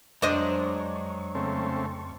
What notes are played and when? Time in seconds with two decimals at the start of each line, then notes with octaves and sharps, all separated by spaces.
0.22 F2 F#3 G#3 D4 C5 D#5 C#6
1.35 C#3 A3 C4